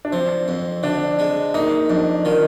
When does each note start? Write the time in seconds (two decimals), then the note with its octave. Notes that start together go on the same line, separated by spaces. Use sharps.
0.05 D4
0.12 F3 C4
0.48 F2
0.83 D3 D4
1.19 G#3
1.54 A#3 D#4
1.90 F2 D4
2.25 D#3 F4